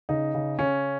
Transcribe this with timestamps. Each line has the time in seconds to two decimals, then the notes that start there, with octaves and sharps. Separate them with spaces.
0.09 C#3 D#4
0.34 C#3
0.59 C#3 C#4